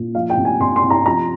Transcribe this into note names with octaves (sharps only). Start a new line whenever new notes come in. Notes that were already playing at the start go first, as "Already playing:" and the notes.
Already playing: A#2
F3 F5
G5
C3
G#5
C3 C6
C6
C3
A#5
F3 A#5